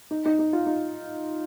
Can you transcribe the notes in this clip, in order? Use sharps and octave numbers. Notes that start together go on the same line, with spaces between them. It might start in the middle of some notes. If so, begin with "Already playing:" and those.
D#4
D#4
D#4
F4
D#4